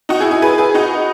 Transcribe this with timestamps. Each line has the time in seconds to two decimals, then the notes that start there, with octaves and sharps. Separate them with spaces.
0.09 D#4 F#4
0.20 E4 G#4
0.31 E4 G#4
0.42 G#4 B4
0.58 G#4 B4
0.75 D#4 F#4